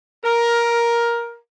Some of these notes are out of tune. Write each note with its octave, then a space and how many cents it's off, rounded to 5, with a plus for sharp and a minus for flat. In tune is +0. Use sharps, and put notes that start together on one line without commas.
A#4 +10